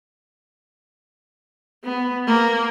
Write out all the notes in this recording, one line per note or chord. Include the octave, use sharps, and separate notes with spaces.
B3
A#3